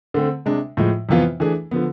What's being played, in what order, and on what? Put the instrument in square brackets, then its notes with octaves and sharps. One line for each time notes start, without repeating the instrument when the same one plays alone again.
[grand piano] D3 A3 C4
C3 G#3 D4
A2 F3 G#3
F2 C3 E3 B3 F4
E3 A3 D4 G#4
D3 F3 B3